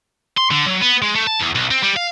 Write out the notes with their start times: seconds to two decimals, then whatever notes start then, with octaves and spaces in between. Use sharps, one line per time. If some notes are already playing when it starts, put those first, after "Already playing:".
0.37 C6
0.51 D3
0.66 F#3
0.82 B3
1.02 G#3
1.15 A3
1.27 A5
1.40 E2
1.55 B1
1.71 C4
1.83 G3
1.97 F5